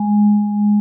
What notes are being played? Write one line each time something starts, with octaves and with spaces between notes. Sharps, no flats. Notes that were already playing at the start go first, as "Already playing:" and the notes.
Already playing: G#3